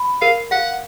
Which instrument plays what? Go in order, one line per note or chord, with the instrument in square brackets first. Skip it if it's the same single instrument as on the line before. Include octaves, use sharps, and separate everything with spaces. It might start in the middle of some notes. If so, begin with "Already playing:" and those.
Already playing: [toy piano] B5
[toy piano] A#4 [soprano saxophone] F5
[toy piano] F5 [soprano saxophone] F#5